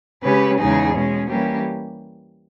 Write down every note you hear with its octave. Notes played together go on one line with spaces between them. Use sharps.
C#3 G#3 C#4 G4 B4
E2 C#3 G#3 D#4 G#4
B2 G#3 C#4
E3 G3 A#3 C#4 G4